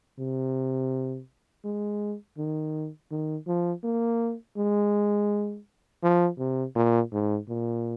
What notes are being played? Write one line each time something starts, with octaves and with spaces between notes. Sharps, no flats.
C3
G#3
D#3
D#3
F3
A#3
G#3
F3
C3
A#2
G#2
A#2